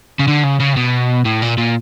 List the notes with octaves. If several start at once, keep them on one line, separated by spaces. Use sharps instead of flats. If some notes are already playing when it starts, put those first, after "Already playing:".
C#3
D3
C#3
C#3
C3
B2
A2
A#2
A#2